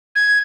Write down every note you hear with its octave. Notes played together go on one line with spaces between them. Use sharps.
G#6